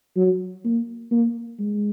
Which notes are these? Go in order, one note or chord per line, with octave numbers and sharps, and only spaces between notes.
F#3
A#3
A#3
G#3